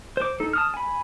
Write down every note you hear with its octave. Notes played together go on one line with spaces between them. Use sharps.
C5 D6
D#4 A4
A5 D#6 F6
G#5 B5